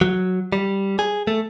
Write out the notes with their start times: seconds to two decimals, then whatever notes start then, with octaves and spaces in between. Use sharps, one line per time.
0.01 F#3
0.52 G3
0.99 G#4
1.27 A3